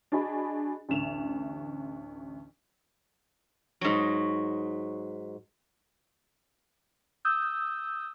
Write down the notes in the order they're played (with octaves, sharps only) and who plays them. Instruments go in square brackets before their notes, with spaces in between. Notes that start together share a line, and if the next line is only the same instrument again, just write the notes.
[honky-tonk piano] D4 F#4 G#4 D#5 B5
A1 D2 E7 F7
[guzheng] G#2 F#3
[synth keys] D#6 E6 G6